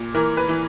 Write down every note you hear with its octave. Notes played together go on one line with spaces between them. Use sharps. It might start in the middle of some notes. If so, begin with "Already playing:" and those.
Already playing: A#2
E3 A#4
B4
E3